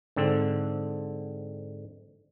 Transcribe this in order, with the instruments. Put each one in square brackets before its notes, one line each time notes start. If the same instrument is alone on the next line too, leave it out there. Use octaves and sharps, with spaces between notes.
[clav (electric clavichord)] G#2 D3 C4